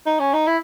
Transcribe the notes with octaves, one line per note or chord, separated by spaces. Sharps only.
D#4
C#4
D#4
E4